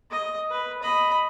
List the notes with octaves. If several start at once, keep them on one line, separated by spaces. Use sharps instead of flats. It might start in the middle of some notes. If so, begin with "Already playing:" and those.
D#5
B4
D#5 B5